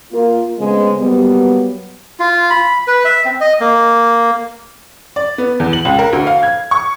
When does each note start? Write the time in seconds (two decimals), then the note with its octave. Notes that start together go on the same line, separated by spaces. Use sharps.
0.12 A#3 F4 A#4
0.59 C#3 G#3 A3 B3 C4 C5
0.99 F#3 G3 A#3 B3
2.20 F4
2.50 B5
2.88 B4
3.05 E5
3.25 C4
3.41 D#5
3.61 A#3
5.16 D5
5.38 B3
5.60 E2
5.73 F#7
5.85 C#2
5.99 A#4
6.13 D2
6.27 F5
6.43 G#6
6.71 C#6